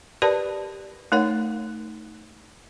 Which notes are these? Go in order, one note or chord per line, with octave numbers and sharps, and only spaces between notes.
G4 A#4 B4 D5 A5 B5
A3 D#4 A#4 C#5 F#5